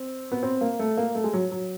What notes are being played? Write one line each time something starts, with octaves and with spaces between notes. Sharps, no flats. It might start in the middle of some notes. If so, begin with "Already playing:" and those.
Already playing: C4
B3
C4
A#3
A3
A#3
A3
G#3
F#3
F#3